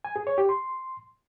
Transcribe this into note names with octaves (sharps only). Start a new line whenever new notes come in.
G#5
G#4
C#5
G4
C6